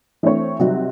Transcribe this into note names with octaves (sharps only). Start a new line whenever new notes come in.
E3 A3 C4 D4 C5 C#5
C3 F#3 G3 D#4 F#4